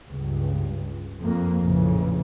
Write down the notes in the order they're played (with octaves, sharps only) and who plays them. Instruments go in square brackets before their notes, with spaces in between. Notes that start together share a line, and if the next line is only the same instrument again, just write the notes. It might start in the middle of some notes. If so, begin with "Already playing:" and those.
[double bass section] C#2 G2
F2 A#3
A1 F2 A#2 C#3 E3